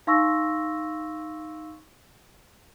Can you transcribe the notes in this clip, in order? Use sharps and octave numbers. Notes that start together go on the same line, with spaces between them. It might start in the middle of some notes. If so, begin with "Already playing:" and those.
D#4 F5 C6 C#6 E6 A#6